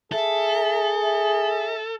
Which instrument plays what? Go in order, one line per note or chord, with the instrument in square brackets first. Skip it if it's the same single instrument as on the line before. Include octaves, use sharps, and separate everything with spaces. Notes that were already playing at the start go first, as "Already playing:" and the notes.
[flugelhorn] G#4 [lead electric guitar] A4 [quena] E5
[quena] E5